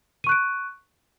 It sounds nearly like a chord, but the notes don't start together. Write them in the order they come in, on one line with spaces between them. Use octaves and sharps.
D#7 C#6 F#6 D7